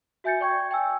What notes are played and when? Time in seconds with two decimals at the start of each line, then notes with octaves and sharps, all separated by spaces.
0.24 F#4 E5 G#5 G6 A6 C#7
0.41 D5 G5 C#6 G6 G#6
0.71 G5 G#5 E6